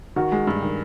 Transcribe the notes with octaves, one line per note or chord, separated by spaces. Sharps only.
D#3 F#4
G#3
G2
D#3